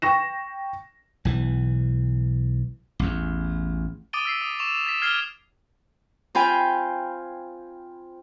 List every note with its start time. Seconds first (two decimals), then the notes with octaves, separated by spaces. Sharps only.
0.02 G5 C#6 A#6 E7
1.25 B1 E3
2.99 A1 E2
4.13 D6 D#6 A6 D7 D#7 G7
4.25 E6 B6 C7
4.41 D#6
4.59 C#6 E7 F7
4.87 A6 B6 E7
5.02 F6 G#6 C7 F7 G7
6.35 C4 F4 F5 G5 G#5 B5